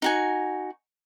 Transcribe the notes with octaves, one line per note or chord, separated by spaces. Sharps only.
D#4 F#4 G#5